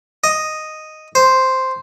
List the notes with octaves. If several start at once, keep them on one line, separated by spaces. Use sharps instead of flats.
D#5
C5